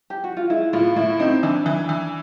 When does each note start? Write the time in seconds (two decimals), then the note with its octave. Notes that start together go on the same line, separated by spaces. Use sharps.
0.10 G4
0.24 F#4
0.37 F4
0.50 G#3 E4
0.73 A2 F4
0.96 A2 E4
1.19 C4 D#4
1.43 E3 D4
1.66 E3
1.89 E3